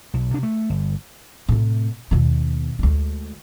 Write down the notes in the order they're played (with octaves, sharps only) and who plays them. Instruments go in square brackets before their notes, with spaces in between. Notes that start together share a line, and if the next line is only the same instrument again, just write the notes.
[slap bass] B1
C3 D4
A3
G1
[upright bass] A2 C3
D#2 B2
D2 G#3